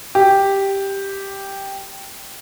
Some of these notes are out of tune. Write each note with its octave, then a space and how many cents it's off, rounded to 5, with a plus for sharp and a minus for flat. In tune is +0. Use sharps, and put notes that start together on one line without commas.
G4 +0